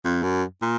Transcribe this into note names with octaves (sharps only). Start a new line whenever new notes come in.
F2
F#2
A#2